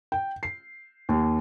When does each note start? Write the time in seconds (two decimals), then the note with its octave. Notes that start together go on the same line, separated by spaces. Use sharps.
0.12 G5
0.43 C7
1.09 D#2